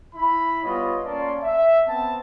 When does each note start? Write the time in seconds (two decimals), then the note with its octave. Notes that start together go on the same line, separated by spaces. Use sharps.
0.15 E4 B5
0.63 G3 B3 F4 C#5 D#5
1.05 A#3 C#4 D5 A5 C6
1.43 E5
1.88 B3 C4 A5